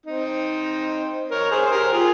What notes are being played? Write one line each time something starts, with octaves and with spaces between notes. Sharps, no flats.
C4 D#4
A#4 C#5
G#4 C5
C5
G4 A#4
F4 G#4